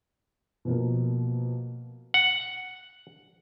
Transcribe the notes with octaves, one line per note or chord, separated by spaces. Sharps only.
B2 F3 A#3
F#5